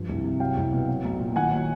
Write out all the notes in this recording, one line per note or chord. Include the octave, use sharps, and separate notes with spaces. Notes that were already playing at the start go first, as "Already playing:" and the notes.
Already playing: G2 F3
C2
C3
F#3 F5 G5
C2
B2
F#3
B1
A#2
D#3 F#5 G#5
F#3